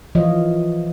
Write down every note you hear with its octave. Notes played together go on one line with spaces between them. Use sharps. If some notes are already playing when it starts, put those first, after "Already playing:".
E3 F3 F4 C#5 D#5